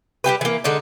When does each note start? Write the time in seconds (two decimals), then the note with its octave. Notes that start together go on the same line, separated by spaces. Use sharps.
0.24 G3 A#3 G4 B4
0.41 E3 A#3
0.64 D3 G#3 D4 D#4